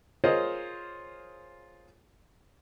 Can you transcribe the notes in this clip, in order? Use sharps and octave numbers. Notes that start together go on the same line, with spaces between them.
F4 G#4 A#4 C5 C#5 D#5